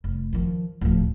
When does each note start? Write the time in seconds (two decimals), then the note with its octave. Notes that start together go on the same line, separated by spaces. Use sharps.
0.04 F1
0.33 D#3 F3
0.81 D1 F3